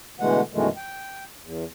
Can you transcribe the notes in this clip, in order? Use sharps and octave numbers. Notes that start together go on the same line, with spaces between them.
B2 D3 E3 G#3 A3 F#5
F#2 B2 D#3 E3 G#3 A3
G5
E2